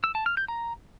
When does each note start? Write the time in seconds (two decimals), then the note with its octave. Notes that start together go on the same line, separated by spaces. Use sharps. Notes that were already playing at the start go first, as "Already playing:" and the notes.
0.04 E6
0.15 A5
0.26 F6
0.37 G6
0.48 A#5